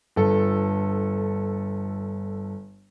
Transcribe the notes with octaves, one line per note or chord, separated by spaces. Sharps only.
G1 A4